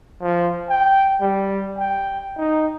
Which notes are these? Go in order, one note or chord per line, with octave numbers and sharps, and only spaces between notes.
F3
G5
G3
G5
D#4